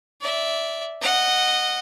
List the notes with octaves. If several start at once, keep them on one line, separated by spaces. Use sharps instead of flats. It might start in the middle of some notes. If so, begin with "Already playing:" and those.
D5 E5
D#5 F#5